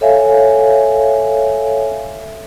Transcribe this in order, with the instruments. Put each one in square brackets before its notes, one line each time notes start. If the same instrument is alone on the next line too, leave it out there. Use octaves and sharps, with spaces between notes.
[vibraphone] A4 C#5 E5 F5 G#5